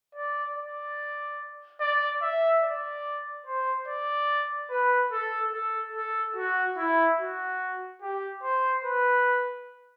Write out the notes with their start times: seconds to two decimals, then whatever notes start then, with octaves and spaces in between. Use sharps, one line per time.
0.15 D5
0.56 D5
1.81 D5
2.22 E5
2.63 D5
3.46 C5
3.88 D5
4.70 B4
5.12 A4
5.53 A4
5.95 A4
6.36 F#4
6.77 E4
7.19 F#4
8.02 G4
8.43 C5
8.85 B4